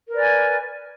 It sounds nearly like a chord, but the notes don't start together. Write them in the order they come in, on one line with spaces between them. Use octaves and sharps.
A#4 B4 D5 G#5